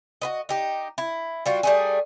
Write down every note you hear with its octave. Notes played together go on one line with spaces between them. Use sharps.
F#4 B4 D#5
D#4 G4
E4
G3 F4 F#4
G3 A3 G#4